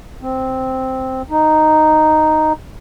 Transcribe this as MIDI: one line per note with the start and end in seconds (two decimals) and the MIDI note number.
0.22 1.22 60
1.30 2.53 63